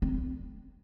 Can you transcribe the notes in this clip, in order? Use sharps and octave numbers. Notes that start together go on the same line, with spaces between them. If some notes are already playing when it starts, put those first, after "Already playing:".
C4